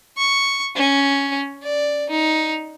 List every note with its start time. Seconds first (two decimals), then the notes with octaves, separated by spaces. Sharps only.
0.17 C#6
0.75 C#4
1.63 D5
2.10 D#4